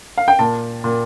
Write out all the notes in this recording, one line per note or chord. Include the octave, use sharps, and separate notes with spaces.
F5
G5
A#2 A5
A#2